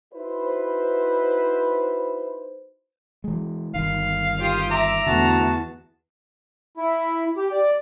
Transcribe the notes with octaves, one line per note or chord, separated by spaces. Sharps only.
D#4 E4 F#4 B4 C5
E3 G#3
G1 D#3 F5
F4 G4 D#6
E5 A#5 D6
E2 D3 A3 F#4 A5
E4
G4
D5